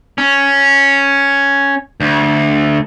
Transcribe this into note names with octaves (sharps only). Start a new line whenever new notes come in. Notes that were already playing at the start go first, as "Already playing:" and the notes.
C#4
D2